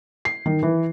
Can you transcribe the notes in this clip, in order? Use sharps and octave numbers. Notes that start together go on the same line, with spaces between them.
C7
D#3
E3